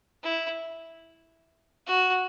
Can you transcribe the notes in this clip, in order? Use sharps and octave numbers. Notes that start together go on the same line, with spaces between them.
E4
F#4